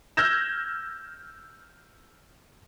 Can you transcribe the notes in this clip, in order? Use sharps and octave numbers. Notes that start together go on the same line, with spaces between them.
E6 F6 G6 G#6 A#6 E7